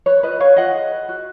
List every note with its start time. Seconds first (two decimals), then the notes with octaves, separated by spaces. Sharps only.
0.06 B4 C#5
0.23 F4 B4 D#5
0.40 B4 C#5 F5
0.57 F4 D#5 F#5
0.74 G#4
0.92 B4
1.09 F#4